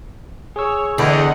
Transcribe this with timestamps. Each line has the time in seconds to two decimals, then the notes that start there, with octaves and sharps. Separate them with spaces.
0.56 G#4 C#5 E6
0.98 E2 D3 D#5 F#5 G5